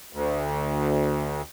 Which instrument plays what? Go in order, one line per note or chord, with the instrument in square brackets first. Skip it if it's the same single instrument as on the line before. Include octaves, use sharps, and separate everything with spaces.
[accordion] D2